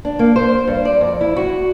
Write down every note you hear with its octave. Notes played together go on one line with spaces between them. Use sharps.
D4
A#3
C5
G2
D5
F2
E4
F#4